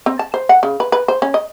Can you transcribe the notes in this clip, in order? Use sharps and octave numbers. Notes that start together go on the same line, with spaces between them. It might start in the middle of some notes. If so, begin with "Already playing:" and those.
C4
A5
C5
F#5
C#3
B4
B4
C5
C#4
D#5